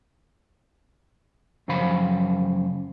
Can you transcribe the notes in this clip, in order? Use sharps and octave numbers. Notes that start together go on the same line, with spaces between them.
F#2 C#3 F3 C5 F5 B5